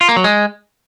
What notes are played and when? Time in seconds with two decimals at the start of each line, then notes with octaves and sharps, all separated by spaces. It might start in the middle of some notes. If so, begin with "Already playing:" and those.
0.01 F4
0.09 A#3
0.16 F#3
0.24 G#3